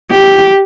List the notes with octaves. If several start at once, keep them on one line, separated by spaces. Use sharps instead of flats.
G4